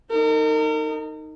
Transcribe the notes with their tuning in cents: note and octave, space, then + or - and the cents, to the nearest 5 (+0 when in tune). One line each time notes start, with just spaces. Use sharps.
D#4 +0 A#4 -40